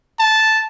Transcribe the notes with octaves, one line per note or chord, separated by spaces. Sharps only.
A5